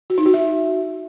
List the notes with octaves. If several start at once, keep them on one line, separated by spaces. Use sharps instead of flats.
F#4
D#4
F#4
E5